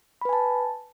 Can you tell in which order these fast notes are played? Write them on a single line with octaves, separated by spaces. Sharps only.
B5 B4 G#5 A5